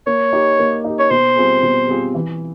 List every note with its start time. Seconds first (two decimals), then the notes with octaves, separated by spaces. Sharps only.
0.07 A#3 C#5
0.33 D#4 G4
0.59 A#3
0.84 D#4 G4
0.99 C#5
1.10 B2 C5
1.36 G3 C4 F4 G#4
1.63 B2
1.88 G3 C4 F4 G#4
2.15 E3